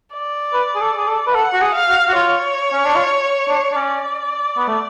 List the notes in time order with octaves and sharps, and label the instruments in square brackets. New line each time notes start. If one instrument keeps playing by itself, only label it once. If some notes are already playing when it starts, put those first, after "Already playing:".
[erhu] D5
[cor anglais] B4
G#4
A4
G#4
A4
B4
[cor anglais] A4 [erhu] F#5
[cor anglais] F#4
G#4
[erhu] F5
[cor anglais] F#4
F#4
[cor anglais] F4 [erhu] C#5
[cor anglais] C#4
D4
F4
D4
D4
[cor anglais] C#4 [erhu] D5
[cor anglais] B3
A3